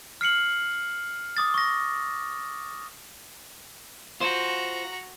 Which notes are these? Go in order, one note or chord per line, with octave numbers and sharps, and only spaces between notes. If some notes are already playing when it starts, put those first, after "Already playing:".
F6 C7 C#7 F#7
D6 D#6 A6
C#6 A#6
F4 F#4 C5 A#5